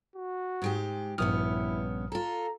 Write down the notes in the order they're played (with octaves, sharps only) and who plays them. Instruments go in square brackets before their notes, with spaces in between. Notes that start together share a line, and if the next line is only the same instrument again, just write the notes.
[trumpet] F#4
[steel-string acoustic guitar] G#2 G#3 G4
[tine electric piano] A#1 D#6 F6 [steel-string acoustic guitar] G2 B3 C#4 [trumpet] E4
[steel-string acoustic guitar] F4 A4 [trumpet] A#5